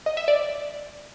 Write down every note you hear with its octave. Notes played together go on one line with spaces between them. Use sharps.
D#5
E5
D5